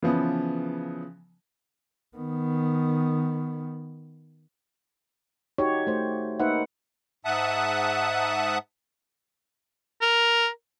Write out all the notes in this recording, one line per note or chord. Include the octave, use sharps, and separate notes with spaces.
C#3 E3 F3 B3
D#3 B3
D#4 F#4 G4 C#5
A3 C5
A#3 D#4 B4 C5 E5 F#5
G#2 E5 F#5 A5 D#6 F#6
A#4